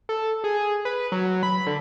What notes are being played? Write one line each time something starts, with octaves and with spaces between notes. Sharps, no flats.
A4
G#4
B4
F#3
B5
D3